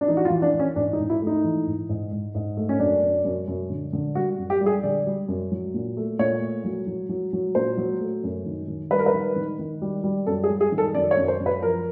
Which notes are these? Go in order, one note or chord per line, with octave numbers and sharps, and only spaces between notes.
D4
E3 D#4
F#4
F4
E3
D4
E3
C#4
G#2 D4
D#4
G#2
E4
A3
D#4
E3
G#2
G#2
G#2
G#2
A3
C#4
F#2 D4
F#2
F#2
F#2
D3
D3
G3 F#4
F#2
G4
G3
G#4
D3 D5
G3
F#2
F#3
A#2
A3
A#2 C#5
A3
F#3
F#3
F#3
F#3
A#2 C5
F#3
A3
F#2
D#3
D#3
G3 B4
A#4
B4
D#3
D#3
D#3
G3
G3
F#2 A4
G#4
G3
G#4
D#3
A4
F#2 D5
C#5
F#2
C5
F#2
B4
F3 A#4